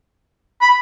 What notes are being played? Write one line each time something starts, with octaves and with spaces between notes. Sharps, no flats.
B5